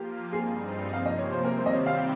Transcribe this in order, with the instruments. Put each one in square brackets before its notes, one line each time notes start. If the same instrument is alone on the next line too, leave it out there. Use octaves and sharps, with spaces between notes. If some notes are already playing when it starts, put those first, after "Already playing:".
Already playing: [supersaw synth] F3 A#3 F4 [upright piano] G4
[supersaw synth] G2 G3 C4 D#4 [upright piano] G#4
[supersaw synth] C3 F3 A#3 [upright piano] F5
[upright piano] D#5
C#5
C5
[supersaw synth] C3 D#3 G3 C4 G4 [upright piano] A#4
[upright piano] C5
D#5
C#5
F5